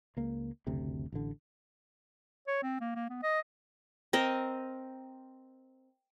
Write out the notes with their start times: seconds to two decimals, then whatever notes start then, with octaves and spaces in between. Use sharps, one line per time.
0.17 C#2 A#3
0.67 F#1 D2 C3
1.12 A1 D3
2.47 C#5
2.63 C4
2.80 A#3
2.96 A#3
3.10 B3
3.23 D#5
4.13 C4 A#4 D#5